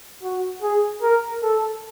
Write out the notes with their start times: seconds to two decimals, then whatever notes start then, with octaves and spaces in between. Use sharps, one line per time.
0.23 F#4
0.62 G#4
1.02 A#4
1.43 A4